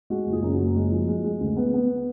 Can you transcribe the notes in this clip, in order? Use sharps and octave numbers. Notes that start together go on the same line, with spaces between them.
G#3 F#4
F#1
F4 G#4
F#2
F#4
F#1
G#3
F3
G#3
G#3
D2
B3
B3